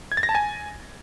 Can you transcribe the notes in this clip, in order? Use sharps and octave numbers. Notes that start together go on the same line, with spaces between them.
G#6
A6
A#6
A5
G#5